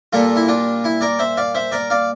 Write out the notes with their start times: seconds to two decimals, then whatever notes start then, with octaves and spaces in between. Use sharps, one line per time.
0.13 A#2 G3 A#3 F4 A4
0.36 E4
0.48 D4 F4
0.84 E4
1.01 A#4 D5
1.19 C5 E5
1.37 D5 F5
1.55 C5 E5
1.72 A#4 D5
1.90 D5 F5